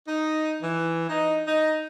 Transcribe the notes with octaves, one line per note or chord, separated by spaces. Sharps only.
D#4
E3
D#4
D#4